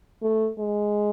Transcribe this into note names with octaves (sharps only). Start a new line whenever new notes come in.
A3
G#3